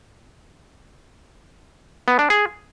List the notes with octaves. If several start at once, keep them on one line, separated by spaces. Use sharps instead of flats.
B3
D4
G#4